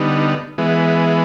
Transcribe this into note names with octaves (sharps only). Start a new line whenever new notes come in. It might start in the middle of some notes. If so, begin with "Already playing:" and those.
Already playing: D3 G3 B3 D#4
E3 G#3 B3